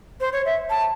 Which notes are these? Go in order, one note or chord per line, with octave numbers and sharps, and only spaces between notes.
C5
C#5
E5
A5